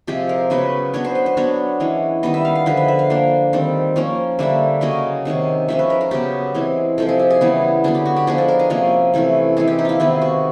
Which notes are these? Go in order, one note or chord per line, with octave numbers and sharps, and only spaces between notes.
C3 F3 G#3 G4
A#4
C#3 F#3 B3 B4
F#3 B3 D4 C#5
C5
B4
C5
F#3 B3 D4 C#5
E3 G#3 C#4
D#3 G3 B3 D#5
E5
F5
F5
D3 F3 G#3 B4
E5
E5
F5
F3 A#3 D4
D#3 G3 C4
F3 A#3 C#4
D3 G3 A#3 D4 E5
C#3 F#3 A#3 C#4 D#5
C3 D#3 G#3 C#4
F3 G#3 C#4 E5
B4
A#4
A#4
C#3 F#3 B3 G4
E3 G#3 C4
C3 F3 G#3 A4
G#4
G4
G#4
C#3 E3 G3 B3
D3 F#3 B3 G#4
G4
F#4
G4
F3 G#3 B3 D4 G#4
A4
A#4
G#4
C3 F3 A#3 C#4
C3 E3 A3 C#4
E3 G#3 C4 G#4
G4
D#4
E4 F4
C3 D#3 G#3 B3 F4
F#4